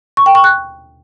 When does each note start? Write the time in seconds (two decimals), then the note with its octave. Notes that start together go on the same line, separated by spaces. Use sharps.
0.17 C#6
0.26 G5
0.35 C#6
0.44 F#6